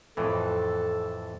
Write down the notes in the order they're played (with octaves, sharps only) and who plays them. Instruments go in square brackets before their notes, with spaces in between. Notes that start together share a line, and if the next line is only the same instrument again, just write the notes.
[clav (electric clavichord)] F2 A2 E3 [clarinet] A4